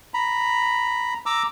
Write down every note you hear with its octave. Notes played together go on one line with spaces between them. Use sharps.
A#5 B5
A#5 D6 E6